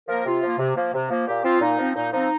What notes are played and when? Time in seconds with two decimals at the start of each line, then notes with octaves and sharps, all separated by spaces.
0.08 F3 A#3 A#4
0.26 C3 F4
0.43 F3 A#3
0.59 C3
0.76 F3 A#3
0.94 C3
1.11 F3 A#3
1.28 A#2 G4
1.44 F3 C4 F4
1.61 A#2 D#4
1.79 F3 C4
1.95 A#2 D#4
2.12 F3 C4 D#4